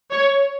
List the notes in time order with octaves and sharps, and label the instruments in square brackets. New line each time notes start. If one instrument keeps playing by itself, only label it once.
[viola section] C#5